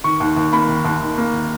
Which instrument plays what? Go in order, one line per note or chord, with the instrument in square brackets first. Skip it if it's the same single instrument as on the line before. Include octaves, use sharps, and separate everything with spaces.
[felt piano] D#3 C#6
D#2
D#2
A#3 B5
D#3
D#2
D#2
A#3
D#3